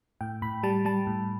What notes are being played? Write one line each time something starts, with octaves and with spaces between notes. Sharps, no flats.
A2 G5
A2 B5
G3 A5
G3 A5
A2